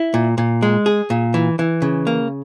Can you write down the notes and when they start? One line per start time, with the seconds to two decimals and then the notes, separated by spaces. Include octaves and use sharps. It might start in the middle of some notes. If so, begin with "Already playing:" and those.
Already playing: E4
0.14 A#2
0.38 A#2
0.63 G#3
0.86 G#4
1.10 A#2
1.34 E3
1.59 E3
1.82 C#3
2.07 A#3